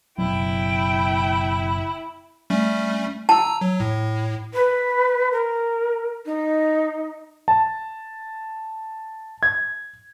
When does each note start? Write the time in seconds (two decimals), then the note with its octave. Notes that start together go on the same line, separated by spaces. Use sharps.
0.18 F#1 B2 F#3 E4 G5
2.50 G3 A3 C#4
3.29 A5 A#5 E6
3.61 F#3
3.80 A2
4.54 B4
5.32 A#4
6.26 D#4
7.48 A5
9.43 G#6